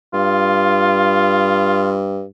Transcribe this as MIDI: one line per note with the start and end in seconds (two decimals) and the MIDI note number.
0.14 2.26 43
0.14 1.97 65